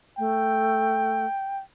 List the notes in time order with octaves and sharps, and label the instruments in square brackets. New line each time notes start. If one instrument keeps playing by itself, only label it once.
[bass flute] A3 [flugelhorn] G5